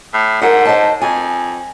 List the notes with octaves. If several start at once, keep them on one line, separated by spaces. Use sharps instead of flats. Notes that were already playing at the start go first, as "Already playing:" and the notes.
A2
G#2 A#4 F#5
C5 D#5 A5
F2 G#5